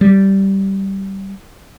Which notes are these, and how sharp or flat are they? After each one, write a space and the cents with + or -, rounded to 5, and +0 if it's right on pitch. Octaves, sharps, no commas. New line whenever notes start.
G3 -15